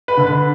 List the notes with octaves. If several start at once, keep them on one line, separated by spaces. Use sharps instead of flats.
B4
D3
B4